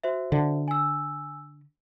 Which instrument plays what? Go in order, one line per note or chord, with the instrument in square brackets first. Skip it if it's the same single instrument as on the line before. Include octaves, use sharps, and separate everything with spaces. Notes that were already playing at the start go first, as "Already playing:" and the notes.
[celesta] F#4 C5 E5
[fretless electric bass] D3
[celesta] G#5 E6